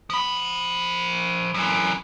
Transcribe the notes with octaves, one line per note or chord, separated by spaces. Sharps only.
F3 B5
F#2 E3